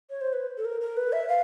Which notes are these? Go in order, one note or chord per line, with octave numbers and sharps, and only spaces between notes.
C#5
C5
B4
A4
A#4
A#4
B4
E5
F5